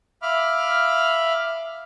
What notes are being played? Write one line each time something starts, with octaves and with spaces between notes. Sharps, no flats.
E5 F5 B5 D6 F6